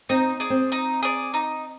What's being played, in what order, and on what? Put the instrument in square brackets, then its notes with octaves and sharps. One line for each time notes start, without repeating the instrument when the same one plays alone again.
[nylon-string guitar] C4 [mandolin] D#4
[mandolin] G#4 D5
[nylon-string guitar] C4
[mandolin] D#4
G#4 D5
D#4